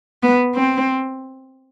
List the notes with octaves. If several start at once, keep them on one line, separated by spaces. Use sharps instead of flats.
B3
C4